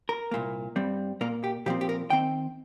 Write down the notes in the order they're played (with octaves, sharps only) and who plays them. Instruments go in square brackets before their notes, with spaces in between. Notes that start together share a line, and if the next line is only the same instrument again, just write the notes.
[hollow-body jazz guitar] A#4
C2 A#2 A#3
G2 G3 C4
A#2 A#3 A#4
G4
A#2 F3 C4 G4
G4
A#4
D#3 C4 G5